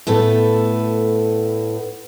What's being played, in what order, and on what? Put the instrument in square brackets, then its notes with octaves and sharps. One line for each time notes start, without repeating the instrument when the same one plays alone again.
[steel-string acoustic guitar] A2 A3 B3 A4